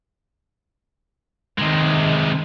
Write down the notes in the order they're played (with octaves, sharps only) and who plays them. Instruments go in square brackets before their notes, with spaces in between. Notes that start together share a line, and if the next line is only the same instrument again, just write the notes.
[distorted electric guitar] C3 G#3 [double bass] D#3